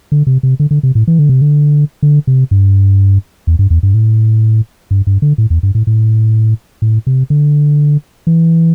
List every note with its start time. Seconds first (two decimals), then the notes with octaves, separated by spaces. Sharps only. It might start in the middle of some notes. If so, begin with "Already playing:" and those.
0.12 D3
0.27 C3
0.43 C3
0.60 D3
0.71 D3
0.83 C3
0.95 A2
1.07 E3
1.19 D3
1.29 C3
1.42 D3
2.03 D3
2.27 C3
2.51 G2
3.47 E2
3.59 G2
3.70 E2
3.83 G2
3.94 A2
4.91 G2
5.07 G2
5.22 D3
5.38 A2
5.50 E2
5.63 G2
5.75 A2
5.87 A2
6.82 A2
7.07 C3
7.30 D3
8.27 E3